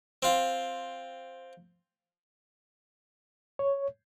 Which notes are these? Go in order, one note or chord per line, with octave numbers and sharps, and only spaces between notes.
C4 F4
C#5